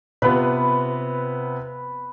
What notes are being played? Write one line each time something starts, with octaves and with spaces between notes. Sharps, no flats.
C3 B3 F4 B4